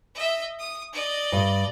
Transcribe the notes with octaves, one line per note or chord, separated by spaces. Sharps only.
D#5 E5
D#6
D5 D#5
G2